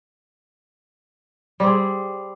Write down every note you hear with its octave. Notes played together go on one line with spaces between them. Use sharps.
G3 C4 G#4